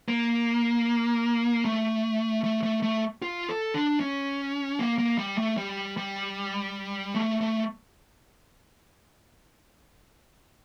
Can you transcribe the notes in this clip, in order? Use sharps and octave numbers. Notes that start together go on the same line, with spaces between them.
A#3
A3
A3
A3
A3
F4
A4
D4
C#4
A#3
A#3
G3
A3
G3
G3
A3
A3